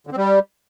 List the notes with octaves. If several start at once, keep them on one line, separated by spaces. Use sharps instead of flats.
D3
C4
G3